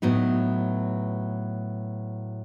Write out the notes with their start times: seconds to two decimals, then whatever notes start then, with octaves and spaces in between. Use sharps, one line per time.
0.02 A2 F#3 B3 D#4